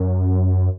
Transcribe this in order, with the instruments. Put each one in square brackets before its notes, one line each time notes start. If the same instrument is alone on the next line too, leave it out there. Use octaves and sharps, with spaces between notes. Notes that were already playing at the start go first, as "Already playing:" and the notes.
Already playing: [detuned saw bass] F#2